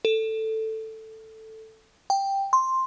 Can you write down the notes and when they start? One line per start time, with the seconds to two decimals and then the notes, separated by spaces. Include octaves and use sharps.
0.05 A4
2.10 G5
2.53 C6